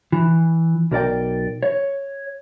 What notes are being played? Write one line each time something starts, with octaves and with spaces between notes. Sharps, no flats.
E3
B1 A#4 D5 G5
C#5